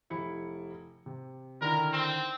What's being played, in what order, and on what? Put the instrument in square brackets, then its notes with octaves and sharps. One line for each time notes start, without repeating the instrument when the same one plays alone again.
[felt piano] F1 E4 C#7
C3
[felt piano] D3 D#3 E4 [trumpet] A#4
[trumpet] C4